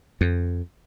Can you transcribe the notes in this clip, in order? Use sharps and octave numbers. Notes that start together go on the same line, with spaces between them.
F2